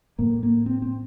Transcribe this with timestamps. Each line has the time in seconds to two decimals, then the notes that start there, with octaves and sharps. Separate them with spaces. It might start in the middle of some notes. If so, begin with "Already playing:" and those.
0.19 A2 A#3
0.43 A#3
0.66 C4
0.82 C4